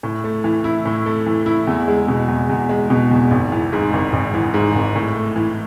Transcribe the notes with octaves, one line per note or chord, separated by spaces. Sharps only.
A2
A3
E3
E4
A2
A3
E3
E4
E2
G#3
B2
E2
E2
G#3
B2
E2
G#1
E3
G#2
G#1
G#1
E3
G#2
G#1
A2
A3
E3